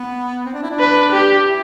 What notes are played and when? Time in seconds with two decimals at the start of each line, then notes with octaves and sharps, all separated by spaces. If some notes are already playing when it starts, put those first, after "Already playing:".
Already playing: B3
0.45 C4
0.54 D4
0.63 E4
0.71 D4
0.80 B4
1.13 G4
1.47 E4